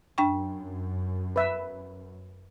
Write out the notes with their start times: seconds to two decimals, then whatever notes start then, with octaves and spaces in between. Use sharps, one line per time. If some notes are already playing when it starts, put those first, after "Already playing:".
0.18 F#2 D4 G5 C#6
1.36 B4 E5